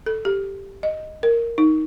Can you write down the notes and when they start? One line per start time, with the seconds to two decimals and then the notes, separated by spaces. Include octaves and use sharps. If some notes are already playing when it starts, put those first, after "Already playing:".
0.06 A4
0.25 G4
0.83 D#5
1.23 A#4
1.58 D#4